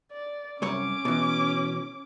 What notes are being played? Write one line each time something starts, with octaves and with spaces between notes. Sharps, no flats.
D5
C2 F#2 C#4 C#5 D6
B2 E3